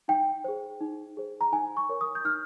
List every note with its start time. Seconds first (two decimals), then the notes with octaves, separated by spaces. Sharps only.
0.08 D#4 G5
0.44 G#4 C5
0.81 D#4
1.17 G#4 C5
1.41 A#5
1.52 D#4 G#5
1.77 C#6
1.89 A#4 C#5
2.01 D#6
2.15 G6
2.25 D#4 F6